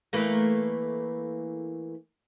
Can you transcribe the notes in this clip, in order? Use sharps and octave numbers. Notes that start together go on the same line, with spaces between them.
E3 A3 A#3